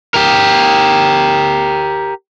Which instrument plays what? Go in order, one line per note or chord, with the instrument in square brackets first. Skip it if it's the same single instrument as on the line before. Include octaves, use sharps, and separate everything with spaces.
[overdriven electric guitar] G4 A#4